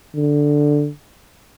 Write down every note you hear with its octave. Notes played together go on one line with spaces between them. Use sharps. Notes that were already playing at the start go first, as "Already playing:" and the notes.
D3